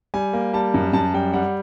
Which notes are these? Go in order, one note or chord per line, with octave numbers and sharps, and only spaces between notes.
G3 G#5
A#3
G3 A5
F#2
F#2 A5
G3 G5
G3 F#5